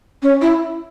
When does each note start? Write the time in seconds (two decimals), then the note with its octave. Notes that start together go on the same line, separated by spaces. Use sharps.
0.22 C#4
0.42 E4